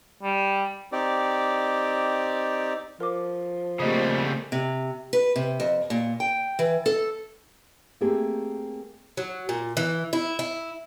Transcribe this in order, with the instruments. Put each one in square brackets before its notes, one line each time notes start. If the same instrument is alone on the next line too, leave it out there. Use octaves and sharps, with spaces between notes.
[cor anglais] G3
[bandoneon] C4 D#4 G4 D5
[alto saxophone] F3 [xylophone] A#4 D6
[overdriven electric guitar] C#3 G3 [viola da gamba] A3 A#3 C4 [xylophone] G4 D#5 D#6
[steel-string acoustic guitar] C3
B4
C3
F2
A#2
G5
E3
A4
[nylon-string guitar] A3 A#3 C4 G4 G#4
[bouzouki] F#3
A#2
E3
E4
E4